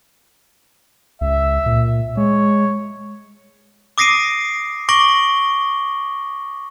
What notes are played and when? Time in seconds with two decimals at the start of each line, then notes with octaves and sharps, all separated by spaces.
1.21 C#2 E5
1.66 A#2
2.17 G#3 C#5
3.98 D6 D#6 A#6 C7 D7 D#7
4.89 C#6 D6 A#6 D7 F#7 G7